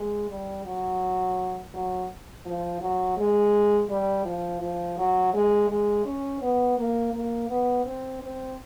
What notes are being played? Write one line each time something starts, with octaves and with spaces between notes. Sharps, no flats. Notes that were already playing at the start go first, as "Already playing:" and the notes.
Already playing: G#3
G3
F#3
F#3
F3
F#3
G#3
G3
F3
F3
F#3
G#3
G#3
C#4
B3
A#3
A#3
B3
C4
C4